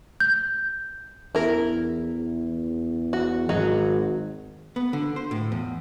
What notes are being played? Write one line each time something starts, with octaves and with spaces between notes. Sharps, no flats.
G6
E2 E4 A#4
F#4
G#1 F#3 D#4 F#4
B3
D3
C5
A2
E2